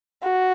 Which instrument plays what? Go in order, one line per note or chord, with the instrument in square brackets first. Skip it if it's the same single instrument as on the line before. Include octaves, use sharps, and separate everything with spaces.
[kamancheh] F#4